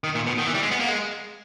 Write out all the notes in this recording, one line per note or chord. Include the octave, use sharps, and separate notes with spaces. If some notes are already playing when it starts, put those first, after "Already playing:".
D#3
A#2
B2
D#3
E3
G3
G#3
B3
A#3
G#3